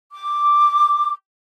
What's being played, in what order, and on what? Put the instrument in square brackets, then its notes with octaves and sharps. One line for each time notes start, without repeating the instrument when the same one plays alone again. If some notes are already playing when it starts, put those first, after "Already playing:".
[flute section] D6